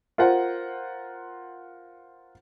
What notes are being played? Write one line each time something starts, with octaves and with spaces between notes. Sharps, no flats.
F4 A#4 C5 F#5